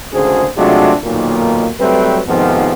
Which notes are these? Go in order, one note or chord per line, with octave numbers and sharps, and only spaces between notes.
G#1 D2 C#3 G#4 C5
C3 F#3 G#3 A3 D4 F4
B1 A#2 D#3 A#3
F#3 G3 A3 C4 B4
F2 G#2 C3 D#3 F3 B3